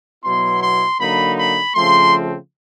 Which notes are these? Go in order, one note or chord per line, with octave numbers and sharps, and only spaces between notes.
B2 F#3 B3 E4 C6
C6
D3 F#3 A#3 D#4 B5
B5
C#3 F3 A3 C4 C6